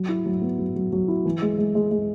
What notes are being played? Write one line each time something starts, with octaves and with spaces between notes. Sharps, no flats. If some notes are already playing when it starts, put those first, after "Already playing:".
Already playing: F#3
E4
F#3
B3
F#3
F#3
F#3
E4
E3
G#3
G#3
G#3
G#3